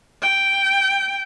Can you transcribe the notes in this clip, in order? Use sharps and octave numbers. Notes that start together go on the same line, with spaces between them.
G5